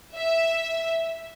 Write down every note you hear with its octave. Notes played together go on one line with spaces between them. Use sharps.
E5